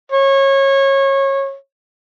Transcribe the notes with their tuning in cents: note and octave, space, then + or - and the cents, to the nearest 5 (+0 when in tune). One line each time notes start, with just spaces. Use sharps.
C#5 -25